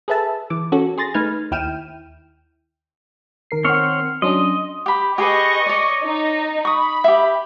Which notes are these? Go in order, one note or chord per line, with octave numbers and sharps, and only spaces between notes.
G#4 A4 B4 E5 A5 E6
E3 D6
C#4 F#4 A4
G#4 C6 A6 A#6
A3 D#4 B4 F6 G#6
D#2 E4 G5 F6 D#7 E7
D#3 A#4 C7
C4 C#5 F#5 F6
F#3 C#4 D4 D#5 C6
G4 B5
G4 G#4 B4 D#5 C#6
C#5 D5
D#4
B5 C#6 D#6
G4 E5